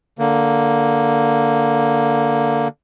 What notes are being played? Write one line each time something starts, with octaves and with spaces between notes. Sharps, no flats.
D3 A#3